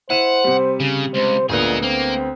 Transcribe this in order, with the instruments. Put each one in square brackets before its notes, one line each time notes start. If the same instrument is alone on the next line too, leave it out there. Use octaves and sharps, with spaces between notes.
[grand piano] E4 D#7 E7 [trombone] C5 [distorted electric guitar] F#5
[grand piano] C3 G3
[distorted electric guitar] C#3
[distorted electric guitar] C#2 [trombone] C5
[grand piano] D2 B3 F#6 [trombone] A#2 [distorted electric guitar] D#4 G#4
[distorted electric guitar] A#3 [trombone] C4